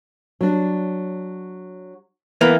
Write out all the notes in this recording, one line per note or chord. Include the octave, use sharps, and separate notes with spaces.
F#3 D4
E3 A#3 B3